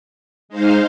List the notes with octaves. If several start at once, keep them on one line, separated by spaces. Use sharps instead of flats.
G#3 D#4 C5 F5